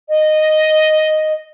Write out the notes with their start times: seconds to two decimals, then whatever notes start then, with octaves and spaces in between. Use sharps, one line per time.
0.08 D#5